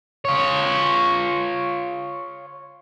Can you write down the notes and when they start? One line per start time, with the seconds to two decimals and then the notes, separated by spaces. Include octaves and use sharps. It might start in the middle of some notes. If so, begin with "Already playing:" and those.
0.25 F4 C#5